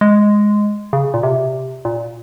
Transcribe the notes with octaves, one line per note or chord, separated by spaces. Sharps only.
G#3
C#3
A#2
C3
A#2